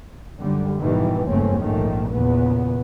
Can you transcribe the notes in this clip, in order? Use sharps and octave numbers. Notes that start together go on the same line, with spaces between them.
F#2 D3 G3
G#2 B2 D#3 E3 G3
F#1 E2 G2 A3 C4 C#4
A#1 G#2 D#3 A3
E2 A#2 C#3 B3